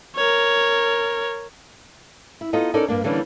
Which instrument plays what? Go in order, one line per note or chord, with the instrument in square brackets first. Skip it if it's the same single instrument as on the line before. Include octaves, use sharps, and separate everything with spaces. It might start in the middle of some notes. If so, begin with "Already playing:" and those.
[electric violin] A#4 C#5
[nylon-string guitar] E4
B3 D#4 F4 A4 D#5
C#4 D#4 A4 A#4 D5
G2 A#3 D4
D3 E3 G3 A#3 C#4 D4